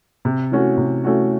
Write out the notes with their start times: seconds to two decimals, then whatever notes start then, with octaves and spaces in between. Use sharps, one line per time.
0.25 C3
0.51 E3 A3 C#4 F#4
0.77 C3
1.04 E3 A3 C#4 F#4